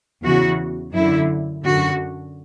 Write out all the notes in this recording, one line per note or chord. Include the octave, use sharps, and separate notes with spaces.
E2 C#3 E3 F#4
F#2 D3 E4
F#2 D3 F#4